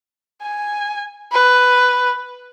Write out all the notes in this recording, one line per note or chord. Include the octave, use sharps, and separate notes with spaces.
G#5
B4